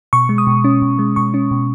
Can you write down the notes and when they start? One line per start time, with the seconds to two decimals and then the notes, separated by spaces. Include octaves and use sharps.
0.13 B2 C#6
0.29 G#3
0.38 D#6
0.47 B2
0.64 C#4
0.82 B2
0.99 G#3
1.16 B2 C#6
1.34 C#4
1.51 B2